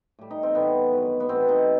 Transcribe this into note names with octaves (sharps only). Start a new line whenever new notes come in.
A2 G3
D#4
C4
A2 E3 G3 B3
G2 D#3 F#3
B3
A2 E3 G3 C4
D#4